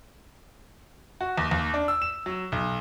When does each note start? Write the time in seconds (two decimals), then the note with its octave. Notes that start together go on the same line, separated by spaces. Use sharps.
1.21 F#4
1.38 D#2
1.51 D#2
1.74 D4
1.88 E6
2.02 E7
2.26 F#3
2.52 B1